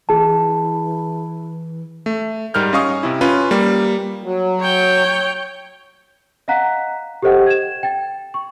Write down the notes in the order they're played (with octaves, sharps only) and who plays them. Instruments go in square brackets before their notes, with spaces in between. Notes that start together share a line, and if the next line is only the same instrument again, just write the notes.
[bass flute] E3 [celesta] G#4 A5
[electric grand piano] A3
G#2 G3 A#4 F6 G6
C#4 D#5 F5 C#6 D#6
C3 E4
C#4 F4 B4
G3 A#3
[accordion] F#3
[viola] C#5 G5
[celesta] D#5 F5 F#5 A#5 F#6 B6
G4 A4 C5 D#5 F#5 G5
G#6 E7
G5 A6
C#6